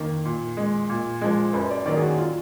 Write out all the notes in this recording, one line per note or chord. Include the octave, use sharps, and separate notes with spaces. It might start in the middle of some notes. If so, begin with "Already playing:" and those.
Already playing: F2 D#3 A#3
A#2
G#3
A#2
F3 G#3
F#2 B4
D5
D#3 F#3 A#3 D5
G#4
F#4
F4